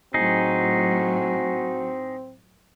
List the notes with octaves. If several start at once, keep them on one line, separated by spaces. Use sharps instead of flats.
A2 F#3 C4 D#4 F#4 G#4